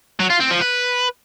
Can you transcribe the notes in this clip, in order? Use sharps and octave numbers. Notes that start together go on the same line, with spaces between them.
F#3
F4
C4
F3
B4